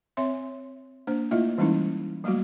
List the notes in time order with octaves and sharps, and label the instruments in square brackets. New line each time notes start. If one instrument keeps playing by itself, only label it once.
[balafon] C4 C#5 E5 C6
A#3 D4 C5
A3 A#3 E4 F4 D#5 E5
E3 G3 G#3 C#4 D#4 E4
F#3 G3 A3 A#3 F#4